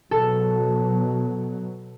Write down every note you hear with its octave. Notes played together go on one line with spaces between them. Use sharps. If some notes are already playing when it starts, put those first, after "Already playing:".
B2 F#3 A4